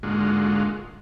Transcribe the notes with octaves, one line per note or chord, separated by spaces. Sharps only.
G#2 D3 G#3 A#3 F4 F#4